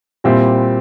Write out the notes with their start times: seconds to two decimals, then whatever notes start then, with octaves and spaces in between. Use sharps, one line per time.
0.24 A#2 G3 C4 E4 G4